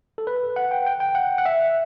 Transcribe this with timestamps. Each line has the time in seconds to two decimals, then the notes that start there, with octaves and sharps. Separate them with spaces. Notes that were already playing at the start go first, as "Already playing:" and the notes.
0.18 A4
0.27 B4
0.56 F#5
0.71 G5
0.87 G5
1.00 G5
1.15 F#5
1.38 F#5
1.46 E5